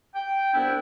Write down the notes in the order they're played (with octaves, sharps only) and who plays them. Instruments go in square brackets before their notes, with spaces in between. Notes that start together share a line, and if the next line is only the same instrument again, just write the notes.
[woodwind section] G5
C2 B3 D4 E4